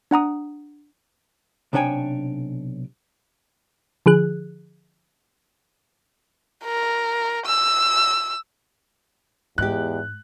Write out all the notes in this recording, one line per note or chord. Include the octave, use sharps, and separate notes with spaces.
D4 F#5 A#5 D#6
B1 C3 D4 C#5 G5 G#5
D3 F3 G#4 F#6
A#4
E6
E2 G#2 G#3 G4 F#6